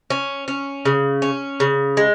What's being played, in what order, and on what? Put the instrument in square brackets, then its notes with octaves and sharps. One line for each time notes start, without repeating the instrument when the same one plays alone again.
[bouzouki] C#4
C#4
C#3
C#4
C#3
G#3